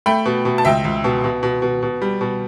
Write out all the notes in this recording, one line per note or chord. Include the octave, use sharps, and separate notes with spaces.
A3 G5 B5
B2
B2
A5
C#2 E5 G5
C#2
B2
B2
B2
B2
B2
G3
B2